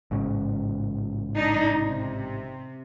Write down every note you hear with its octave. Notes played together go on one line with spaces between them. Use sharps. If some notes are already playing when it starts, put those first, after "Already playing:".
A1 G#2 C#3
D4 D#4
C3